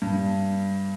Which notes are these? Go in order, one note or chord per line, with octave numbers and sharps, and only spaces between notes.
G2